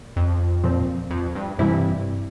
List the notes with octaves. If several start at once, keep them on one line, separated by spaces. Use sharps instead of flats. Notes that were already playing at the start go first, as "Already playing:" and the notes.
Already playing: A#2
F2
A#2 F3 C4
F2
G2
G2 C3 E3 G3 C4 E4